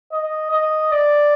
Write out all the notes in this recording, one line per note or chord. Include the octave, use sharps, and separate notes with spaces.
D#5
D#5
D5